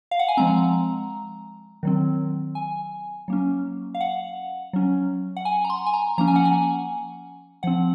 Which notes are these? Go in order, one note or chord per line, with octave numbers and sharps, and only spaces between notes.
F5
F#5
G#5
F3 G#3 C4 A#5
D#3 F#3 C4
G#5
F#3 A#3 C#4
F5
F#5
F#3 C#4
F#5
G#5
A#5
C6
G#5
A#5
F3 A#3 C#4 A#5
G#5
F#5
G#5
F3 C4 F#5